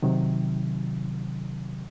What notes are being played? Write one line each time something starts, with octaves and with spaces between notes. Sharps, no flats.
C3 D#3 F#3